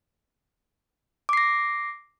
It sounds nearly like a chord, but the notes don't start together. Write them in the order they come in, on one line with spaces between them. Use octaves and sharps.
D6 C7 A#6